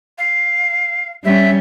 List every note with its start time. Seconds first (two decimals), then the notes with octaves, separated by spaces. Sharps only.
0.18 F5
1.24 G3 C#4 E5